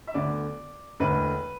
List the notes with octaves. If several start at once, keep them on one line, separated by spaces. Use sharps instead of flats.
E5
D2 D3 B3 D5
E1 D2 D3 B4